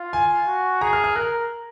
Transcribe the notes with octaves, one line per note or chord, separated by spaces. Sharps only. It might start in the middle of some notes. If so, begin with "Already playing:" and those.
Already playing: F4
G#5
F#4
G#4 A#5
F6
F6
A#4 F#6